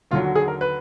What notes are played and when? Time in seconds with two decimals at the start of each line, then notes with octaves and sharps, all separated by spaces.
0.11 D#2 D3 F#3 F4
0.24 F#4
0.36 G#4
0.48 A#4
0.61 B4